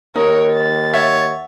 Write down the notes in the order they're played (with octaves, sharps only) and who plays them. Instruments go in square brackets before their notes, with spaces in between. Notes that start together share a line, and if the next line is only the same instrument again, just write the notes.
[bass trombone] D#2 [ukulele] D#4 [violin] A#4 C#5
[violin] A6
[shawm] C#5 [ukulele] E5 F#5